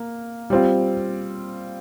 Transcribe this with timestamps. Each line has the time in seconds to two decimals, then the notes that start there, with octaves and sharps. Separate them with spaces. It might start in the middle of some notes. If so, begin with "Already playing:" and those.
Already playing: A#3
0.50 G3 C4 F4